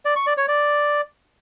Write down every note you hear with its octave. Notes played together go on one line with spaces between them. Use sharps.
D5
C#6
D5
C#5
D5